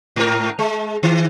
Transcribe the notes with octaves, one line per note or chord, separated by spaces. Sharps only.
G#2 A#4
G#3
D#3